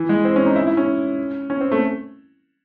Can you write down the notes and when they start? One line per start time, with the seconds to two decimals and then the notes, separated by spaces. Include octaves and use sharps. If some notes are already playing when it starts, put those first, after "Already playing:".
Already playing: E3
0.09 G#3
0.25 C4
0.36 C#4
0.46 D#4
0.55 E4
0.67 E4
0.77 C#4
1.50 C#4
1.61 C4
1.71 A3